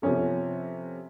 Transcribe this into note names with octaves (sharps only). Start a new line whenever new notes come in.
C3 F3 B3 C#4 A4